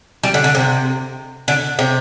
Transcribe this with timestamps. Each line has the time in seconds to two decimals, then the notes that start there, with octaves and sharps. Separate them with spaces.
0.24 G3
0.34 D3
0.44 D3
0.55 C3
1.48 D3
1.79 C3